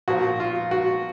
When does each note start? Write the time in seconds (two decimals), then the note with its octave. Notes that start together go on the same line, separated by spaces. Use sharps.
0.08 A#2 F3 F#4
0.40 F4
0.71 F#4